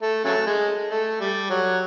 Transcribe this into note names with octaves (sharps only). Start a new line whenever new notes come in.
A3
C#3 F#3 A3
G#3
A3
G3
F#3